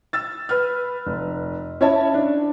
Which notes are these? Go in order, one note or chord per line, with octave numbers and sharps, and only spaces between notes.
E6 A6
B4 F6
F1
C#4 E4 C#5 D#5 E5 A5
D4